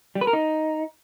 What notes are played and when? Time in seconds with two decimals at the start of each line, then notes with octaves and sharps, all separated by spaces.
0.15 G3
0.21 B4
0.27 A#4
0.33 D#4